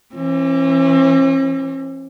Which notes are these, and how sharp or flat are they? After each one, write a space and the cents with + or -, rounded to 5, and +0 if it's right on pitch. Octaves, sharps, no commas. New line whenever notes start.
E3 +20 C#4 -45